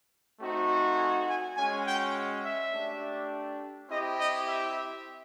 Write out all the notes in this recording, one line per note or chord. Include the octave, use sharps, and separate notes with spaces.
A3 C4 D#4 F#4
G#5
G#5
G#3 C#4 F#4 G#5
G5
E5
A3 D4 G4
C4 E4 G4 D#5
D#5
E5